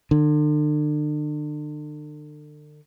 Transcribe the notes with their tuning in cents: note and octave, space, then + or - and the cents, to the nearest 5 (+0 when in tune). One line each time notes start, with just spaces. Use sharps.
D3 +35